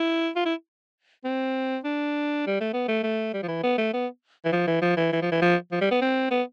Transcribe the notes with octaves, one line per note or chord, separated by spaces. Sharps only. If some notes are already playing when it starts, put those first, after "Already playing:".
Already playing: E4
F4
E4
C4
D4
G3
A3
B3
A3
A3
G3
F3
E3
B3
A3
B3
E3
F3
E3
F3
E3
E3
F3
E3
F3
F3
G3
B3
C4
B3